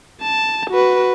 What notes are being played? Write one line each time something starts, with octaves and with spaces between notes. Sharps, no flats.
A5
F#4 B4